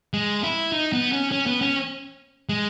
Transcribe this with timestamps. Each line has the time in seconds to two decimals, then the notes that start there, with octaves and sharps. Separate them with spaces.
0.14 G#3
0.43 E4
0.73 D#4
0.93 B3
1.12 C#4
1.32 C#4
1.47 B3
1.61 C#4
2.49 G#3